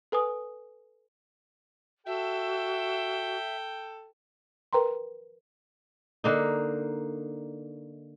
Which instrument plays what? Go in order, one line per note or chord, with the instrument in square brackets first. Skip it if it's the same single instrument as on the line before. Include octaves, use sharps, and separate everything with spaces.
[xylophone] A4 B4 G#5 D#6
[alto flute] F#4 [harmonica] A4 G5 [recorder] E5
[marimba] A#4 B4 G5 A#5 C6
[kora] D3 A#3 D#4